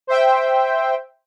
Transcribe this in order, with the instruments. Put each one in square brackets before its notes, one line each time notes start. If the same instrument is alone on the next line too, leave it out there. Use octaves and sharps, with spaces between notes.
[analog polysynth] C5 E5 G5